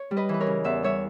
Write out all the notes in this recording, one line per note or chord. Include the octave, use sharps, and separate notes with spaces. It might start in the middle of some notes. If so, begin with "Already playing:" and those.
Already playing: C#5
G3
B4 D#5
E3 B4
A#4 C#5
C#3
E2 E5
G3 C#5 E5